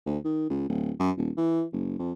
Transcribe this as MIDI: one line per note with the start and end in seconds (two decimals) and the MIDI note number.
0.06 0.18 38
0.24 0.49 51
0.50 0.67 37
0.69 0.91 26
1.00 1.11 42
1.17 1.30 27
1.37 1.63 52
1.73 1.98 30
1.99 2.12 41